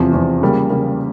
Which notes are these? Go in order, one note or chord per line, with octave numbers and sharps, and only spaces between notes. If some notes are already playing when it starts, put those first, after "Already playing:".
Already playing: E2 C3 F3
E2 C3 F3
C#3 G3 A#3
C#3 G3 A#3